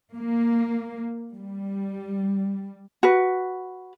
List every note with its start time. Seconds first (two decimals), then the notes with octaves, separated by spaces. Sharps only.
0.13 A#3
1.36 G3
3.03 F#4 B4